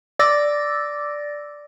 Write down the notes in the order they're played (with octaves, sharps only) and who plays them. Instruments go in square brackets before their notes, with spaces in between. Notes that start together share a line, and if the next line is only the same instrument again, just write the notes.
[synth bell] D5 D6 E6 A6 A#6